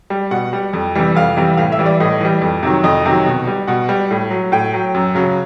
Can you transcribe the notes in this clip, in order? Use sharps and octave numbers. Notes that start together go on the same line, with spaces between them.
G3
B2 F#5
G3
F2
C3 E3 G3
F2 F5
C3 E3 G3
A2 F5
E5
E3 G3
D5
A2 D#5
E3 G3
F2
C3 D#3 F#3
F2 D#5
C3 D#3 F#3
B2
G3
B2 F#5
G3
A2
F#3
A2 G5
F#3
F#2
C#3 F#3